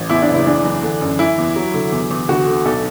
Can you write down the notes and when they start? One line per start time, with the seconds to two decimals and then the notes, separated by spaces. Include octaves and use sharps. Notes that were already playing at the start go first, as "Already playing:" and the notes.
Already playing: A1
0.10 E2 E4
0.22 D4
0.29 F#1
0.34 E4
0.46 E3 D4
0.65 E3
0.82 D3
1.01 F#2
1.19 E3 E4
1.38 E2
1.56 F#3
1.74 D3
1.92 E2
2.11 E2
2.29 D2 F#4
2.47 D3
2.65 B1 A4